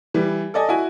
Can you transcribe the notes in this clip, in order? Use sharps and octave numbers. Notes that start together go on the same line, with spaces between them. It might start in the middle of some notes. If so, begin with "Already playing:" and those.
E3 G3
A4 D5 D#5 G#5
E4 F#4 G#5